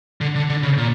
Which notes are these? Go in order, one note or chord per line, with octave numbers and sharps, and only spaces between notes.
D3
D3
D3
C#3
A#2